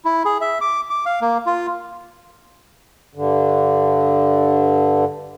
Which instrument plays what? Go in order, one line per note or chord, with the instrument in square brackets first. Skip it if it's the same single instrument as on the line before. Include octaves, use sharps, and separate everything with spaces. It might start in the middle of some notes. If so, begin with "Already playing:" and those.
[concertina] E4
G#4
E5
D6
D6
F5
A#3
F4
[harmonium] G2 D3